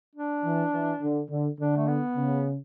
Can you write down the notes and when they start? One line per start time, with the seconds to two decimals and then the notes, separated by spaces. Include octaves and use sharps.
0.15 D4
0.44 E3
0.73 E3
1.01 D3
1.29 D3
1.59 D3 D4
1.77 A3
1.87 B3
2.16 C#3